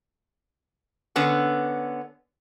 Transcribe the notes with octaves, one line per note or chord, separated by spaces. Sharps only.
D3 B3 C#4